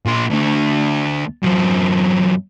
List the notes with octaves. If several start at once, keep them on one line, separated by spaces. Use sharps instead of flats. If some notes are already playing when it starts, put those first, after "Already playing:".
A#2 C5
D2 D3
F#2 C4